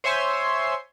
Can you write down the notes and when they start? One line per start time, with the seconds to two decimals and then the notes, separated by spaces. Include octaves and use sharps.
0.04 C5 C#5 E5 G#5 C6